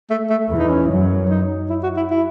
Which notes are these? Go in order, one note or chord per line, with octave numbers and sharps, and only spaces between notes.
A3
A3
E2 E3
D#4
C#4
F#2 F#3
D#4
E4
F#4
E4
E4